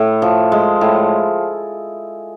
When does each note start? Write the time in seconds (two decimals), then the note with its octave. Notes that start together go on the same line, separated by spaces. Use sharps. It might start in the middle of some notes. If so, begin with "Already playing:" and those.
Already playing: A2
0.22 F3
0.52 G#3
0.81 A2